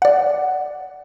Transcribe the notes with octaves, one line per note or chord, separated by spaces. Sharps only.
D5 F#5